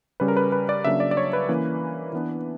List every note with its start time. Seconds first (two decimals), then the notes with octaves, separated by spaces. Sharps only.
0.20 C#3 G3 C#4 B4
0.28 A#4
0.37 B4
0.52 B4
0.69 D5
0.84 C#3 F#3 A#3 D4 E5
1.00 D5
1.11 D5
1.17 C#5
1.33 B4
1.49 E3 A#3 C#4
2.13 E3 B3 D4